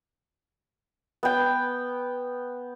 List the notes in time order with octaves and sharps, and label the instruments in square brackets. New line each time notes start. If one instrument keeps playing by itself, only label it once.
[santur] B3 G5